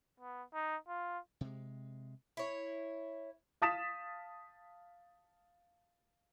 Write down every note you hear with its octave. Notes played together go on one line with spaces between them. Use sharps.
B3
D#4
F4
C3 G#3
E4 C#5
F5 A5 D#6 A6 B6 E7